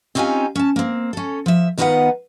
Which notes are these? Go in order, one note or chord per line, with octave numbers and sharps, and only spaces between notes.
C4 C#4 D#4 F4 G4 G#5
C#4 A5
A#3 C4
C#4 A4
F3 E5
D#3 B3 D#4 F4 B4 F#5